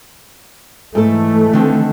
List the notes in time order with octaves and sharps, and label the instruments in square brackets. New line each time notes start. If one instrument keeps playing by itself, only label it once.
[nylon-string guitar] G#2 A4 [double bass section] E3 A3
[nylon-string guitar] D3 D#3 C4